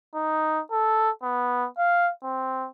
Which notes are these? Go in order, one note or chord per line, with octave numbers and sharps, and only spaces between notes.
D#4
A4
B3
F5
C4